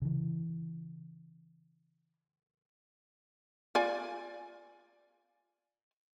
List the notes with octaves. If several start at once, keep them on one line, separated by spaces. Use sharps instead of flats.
C#3 E3
F4 D5 G#5